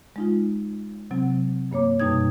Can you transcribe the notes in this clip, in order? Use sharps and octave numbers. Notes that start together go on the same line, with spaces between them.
G#3 D#4 F4
C3 F#3 C4
G2 A#3 C#5 D6
F#2 B2 G3 D#4 D#6 G#6